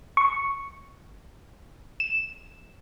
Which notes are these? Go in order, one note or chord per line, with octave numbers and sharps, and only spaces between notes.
C#6
E7